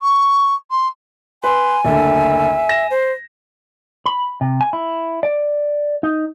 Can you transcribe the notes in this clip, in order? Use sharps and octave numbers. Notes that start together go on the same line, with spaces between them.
C#6
C6
B4 G#5 C6
F#1 D2 D3 E5
A#6 E7
C5
B5
C3
G#5
E4
D5
D#4